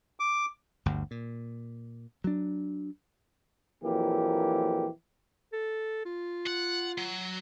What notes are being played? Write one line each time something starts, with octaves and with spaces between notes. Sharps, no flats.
D6
G1 D2 G2
A#2
F#3 D4
A#1 F2 E3 F#3 A#3 G4
A4
F4
F#5
F#3